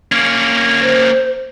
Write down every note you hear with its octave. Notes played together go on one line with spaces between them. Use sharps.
A#3 C#4
C5